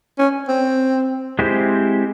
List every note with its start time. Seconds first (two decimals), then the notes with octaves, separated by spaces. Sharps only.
0.19 C#4
0.48 C4
1.39 G#3 C4 E4 G4 C5